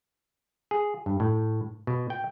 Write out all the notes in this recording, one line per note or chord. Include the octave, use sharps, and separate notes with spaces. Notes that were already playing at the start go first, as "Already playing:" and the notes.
G#4
G2
A2
B2
G5